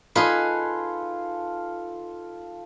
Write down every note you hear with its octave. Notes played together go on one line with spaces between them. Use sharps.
D#4 F4 G#4 A4 B4